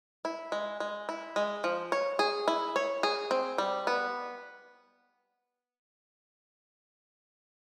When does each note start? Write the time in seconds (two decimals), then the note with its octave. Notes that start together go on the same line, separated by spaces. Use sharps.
0.25 E4
0.52 G#3
0.80 G#3
1.09 E4
1.36 G#3
1.64 F3
1.92 C#5
2.19 G#4
2.48 E4
2.76 C#5
3.03 G#4
3.31 C4
3.58 G3
3.87 B3